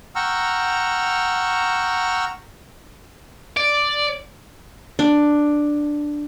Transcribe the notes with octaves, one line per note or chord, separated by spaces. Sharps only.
F#5 G5 A#5 C#6 E6 F6
D5
D4